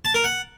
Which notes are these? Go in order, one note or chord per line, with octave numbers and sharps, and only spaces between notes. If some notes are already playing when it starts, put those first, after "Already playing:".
A5
A#4
F#5